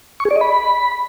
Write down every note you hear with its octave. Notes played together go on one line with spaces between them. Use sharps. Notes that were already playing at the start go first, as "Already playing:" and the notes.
C#6
G#4
D5
D#5
B5